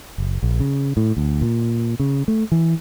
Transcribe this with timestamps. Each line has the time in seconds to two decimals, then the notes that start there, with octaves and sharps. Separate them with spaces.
0.18 F#1
0.43 A#1
0.60 C#3
0.97 A2
1.17 D2
1.42 A#2
2.00 C#3
2.28 A3
2.52 E3